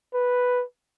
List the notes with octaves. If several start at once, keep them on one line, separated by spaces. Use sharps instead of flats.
B4